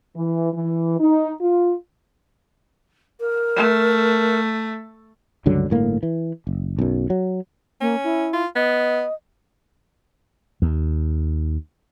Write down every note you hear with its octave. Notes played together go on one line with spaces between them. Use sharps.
E3
E3
D#4
F4
A#4
A3
C#2 G2 D3 F#3
G1 A2 A#3
E3
F#1
B1 F#2
F#3
A#3 C#4
E4
F4
B3 D#5
D#2